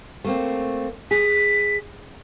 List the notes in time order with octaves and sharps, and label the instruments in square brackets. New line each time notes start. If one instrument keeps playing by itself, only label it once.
[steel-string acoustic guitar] A3 A#3 C4
[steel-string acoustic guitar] G#4 [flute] B6